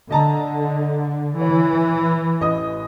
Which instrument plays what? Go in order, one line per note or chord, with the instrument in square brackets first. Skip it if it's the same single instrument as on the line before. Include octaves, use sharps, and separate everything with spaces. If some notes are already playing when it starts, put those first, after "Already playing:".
[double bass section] D3 [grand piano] D#5 A5 A#5
[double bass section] E3 [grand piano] C#5
[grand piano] A1 D#5 D#6